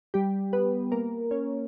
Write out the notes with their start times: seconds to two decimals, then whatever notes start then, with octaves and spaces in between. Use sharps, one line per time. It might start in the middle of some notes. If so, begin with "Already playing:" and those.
0.14 G3 G4
0.53 B3 B4
0.92 A#3 A#4
1.31 C#4 C#5